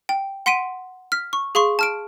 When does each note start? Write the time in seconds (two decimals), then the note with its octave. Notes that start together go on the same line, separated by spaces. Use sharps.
0.09 G5
0.46 F#5 C6 B6 D7 D#7
1.12 F6 B6
1.33 C#6
1.55 G#4 F5 C6 C#6
1.79 A5 F6 D7